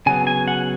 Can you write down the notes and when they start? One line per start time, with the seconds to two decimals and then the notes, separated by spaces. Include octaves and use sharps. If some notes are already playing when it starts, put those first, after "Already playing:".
0.06 C#3 F#3 B3 G#5
0.27 G#5
0.48 F#5